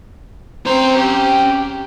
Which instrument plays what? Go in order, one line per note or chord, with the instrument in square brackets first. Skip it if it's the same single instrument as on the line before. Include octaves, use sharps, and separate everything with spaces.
[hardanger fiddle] C4 C5 [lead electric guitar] C#4 A#5
[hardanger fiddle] G4